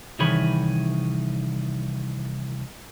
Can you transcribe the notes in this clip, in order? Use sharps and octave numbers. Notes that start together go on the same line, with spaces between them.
C2 D#3 E3 G#4 C#5 B5